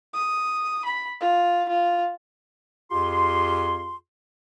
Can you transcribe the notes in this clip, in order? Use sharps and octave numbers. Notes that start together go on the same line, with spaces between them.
D#6
B5
F4
F4
F2 F4 G4 G#4 C6